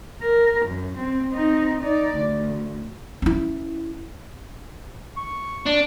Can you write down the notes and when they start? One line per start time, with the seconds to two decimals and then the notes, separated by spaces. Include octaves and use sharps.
0.22 A#4
0.66 F#2
0.98 C4
1.32 C4 D#4
1.81 D#4 D5
2.16 D2
3.22 C#4 E4
5.17 C#6
5.66 D4